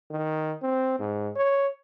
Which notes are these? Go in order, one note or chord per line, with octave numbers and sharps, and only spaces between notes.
D#3
C4
G#2
C#5